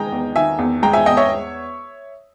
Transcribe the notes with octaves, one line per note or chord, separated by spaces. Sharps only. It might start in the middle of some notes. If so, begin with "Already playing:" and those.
Already playing: D#3 G#3 D#5 G5 G#5 A#5
E2
D#3 E5 G#5
E2
G#3 G5 A#5
E5 G#5
E2 D#5 G5
C#5 E5